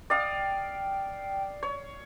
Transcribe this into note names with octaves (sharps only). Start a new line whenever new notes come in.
D5 F5 G5 D#6
C#5